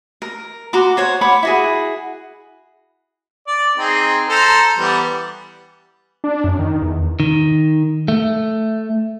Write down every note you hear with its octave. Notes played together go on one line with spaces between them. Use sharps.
A#4
F#4 A#5 C6 D6
C5 C#5 F#5
C#5 F#5 B5 D6
E4 F#4 G#4
D5
C4 D#4 G#4
A4 C5 A#5
E3 G3 B3
D4
F#2
D#3
E2
D#3
A3